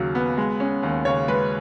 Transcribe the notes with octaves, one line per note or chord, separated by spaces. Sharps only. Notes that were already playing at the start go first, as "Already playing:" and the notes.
Already playing: D#2 C#3 F#3
B3
G#3
C#4
D#2
C#3 C#5
G#3 B4